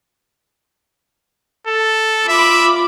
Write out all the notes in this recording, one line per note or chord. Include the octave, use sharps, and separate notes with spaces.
A4
F4 E5 B5 D6